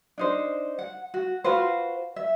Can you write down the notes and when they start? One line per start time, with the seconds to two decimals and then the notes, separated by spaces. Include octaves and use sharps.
0.18 D4 D#4 C5
0.79 F#5
1.14 F#4
1.44 F4 F#4 B4 C5
2.16 E5